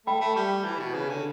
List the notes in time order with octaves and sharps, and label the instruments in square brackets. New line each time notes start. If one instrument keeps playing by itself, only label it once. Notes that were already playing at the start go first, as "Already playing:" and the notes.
[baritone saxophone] A3 [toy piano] G5 B5
[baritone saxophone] A3
[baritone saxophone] G3 [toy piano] A5 C#6
[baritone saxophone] E3
B2
C#3
D3